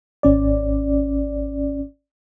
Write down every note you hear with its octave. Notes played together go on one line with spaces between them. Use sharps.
G#1 C#4 D5